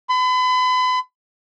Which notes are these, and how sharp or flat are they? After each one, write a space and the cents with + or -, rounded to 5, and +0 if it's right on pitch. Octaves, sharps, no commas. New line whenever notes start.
B5 +40